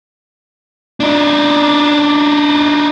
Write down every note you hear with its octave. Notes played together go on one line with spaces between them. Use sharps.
D4 D#4